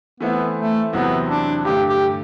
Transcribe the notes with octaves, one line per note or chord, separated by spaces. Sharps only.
E3 A3 B3 C4 E4
A3
E2 C3 F#3 B3 C4 E4
D4
G2 D3 A3 G4
G4